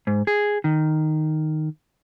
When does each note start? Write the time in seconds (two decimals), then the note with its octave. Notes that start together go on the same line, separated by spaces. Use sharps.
0.07 G#2
0.27 G#4
0.64 D#3